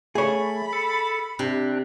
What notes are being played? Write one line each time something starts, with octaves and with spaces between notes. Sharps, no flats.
A3 G#4 C#5 B5
A4
C3 D4